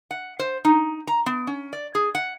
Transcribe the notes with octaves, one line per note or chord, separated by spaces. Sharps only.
F#5
C5
D#4
A#5
B3
C#4
D5
G#4
F#5